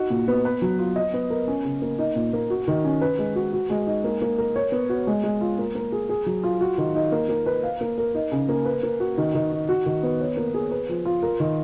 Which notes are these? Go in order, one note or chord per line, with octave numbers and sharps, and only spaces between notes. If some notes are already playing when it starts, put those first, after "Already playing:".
Already playing: D#4 F#4
A#2
B3
B4
F#3
F4
D#5
B3
A#4
C#4
C#3
A#3
D#4
A#2
A#3
F#4
D#3
C#4
B4
G#3
F#4
F#4
G#3
D#4
A#3
A#3
A#4
C#5
B3
F#4
G#3
G#3
F4
A#3
A#3
G#4
G#4
F#3
F4
F#4
D#3
D#4
A#3
A#3
B4
F5
A#3
A#4
D#4
C#3
A#3
B4
A#3
F#4
D#3
D#3
D#4
F#4
D#3
B3
C#5
A#3
G#4
B4
F3
F4
A#4
D#3